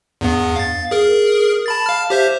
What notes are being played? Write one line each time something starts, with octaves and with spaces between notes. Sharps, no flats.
E2 G2 B3
F5 A6
G#4 A#4
A5 B5 A6
F5 A5 F6
G4 C5 E5